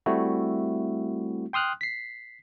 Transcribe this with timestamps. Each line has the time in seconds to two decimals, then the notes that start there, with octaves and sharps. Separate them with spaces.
0.06 G3 A3 C4 E4 F#4
1.53 G5 C6 D#6 F6 F#6
1.81 B6 C7